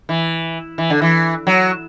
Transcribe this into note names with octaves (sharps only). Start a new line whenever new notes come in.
E3
E3
D3
E3
F#3